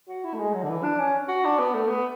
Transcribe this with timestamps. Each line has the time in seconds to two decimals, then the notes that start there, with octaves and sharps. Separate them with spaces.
0.09 F#4
0.24 E4
0.34 A3
0.39 G#3
0.54 F#3
0.64 D3
0.69 E3
0.84 D4
1.00 C#4
1.29 F#4
1.45 D4
1.59 B3
1.74 A3
1.89 B3